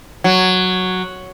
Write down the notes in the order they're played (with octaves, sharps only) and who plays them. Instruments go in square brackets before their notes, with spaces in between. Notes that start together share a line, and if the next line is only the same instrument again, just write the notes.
[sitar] F#3